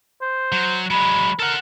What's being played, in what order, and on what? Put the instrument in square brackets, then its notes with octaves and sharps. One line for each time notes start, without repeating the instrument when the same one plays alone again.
[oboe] C5
[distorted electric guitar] F#3
[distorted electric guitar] F#3 G#3 [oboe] B5
[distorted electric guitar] A4 F#5 [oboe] A#4